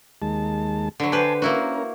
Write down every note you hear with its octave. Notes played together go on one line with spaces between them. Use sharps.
D#2 G#3 A5
D3 F#3
G4 B4 C5 G#5 A5
A#3 C#4 E4 F#4 A#4